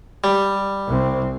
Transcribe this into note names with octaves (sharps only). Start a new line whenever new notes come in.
G3
C2 C4